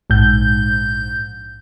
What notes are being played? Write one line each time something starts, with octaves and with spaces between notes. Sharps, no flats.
A#1 G#2 G6